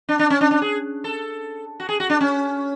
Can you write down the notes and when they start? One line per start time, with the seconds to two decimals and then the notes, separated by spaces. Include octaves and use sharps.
0.09 D4
0.19 D4
0.30 C#4
0.41 D4
0.51 D4
0.62 G#4
1.04 A4
1.80 F#4
1.89 G#4
2.00 F#4
2.10 D4
2.21 C#4